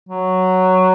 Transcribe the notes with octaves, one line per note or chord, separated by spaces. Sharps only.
F#3